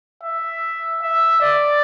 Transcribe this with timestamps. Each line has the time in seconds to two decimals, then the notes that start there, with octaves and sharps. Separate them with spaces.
0.23 E5
1.02 E5
1.41 D5